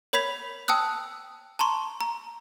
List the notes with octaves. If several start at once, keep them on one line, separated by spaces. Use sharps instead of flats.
A#4 C#5 B5 G#6 B6 F7
G5 A5 D#6 E6 F#6
A5 A#5 C6 C#6
A#5